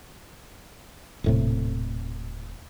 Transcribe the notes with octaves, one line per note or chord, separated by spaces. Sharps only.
D#1 A2 C3